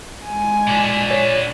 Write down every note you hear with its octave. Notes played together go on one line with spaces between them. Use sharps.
G#3 G#5
A#2 D4
C#5